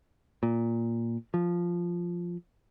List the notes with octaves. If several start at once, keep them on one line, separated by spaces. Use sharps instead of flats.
A#2
F3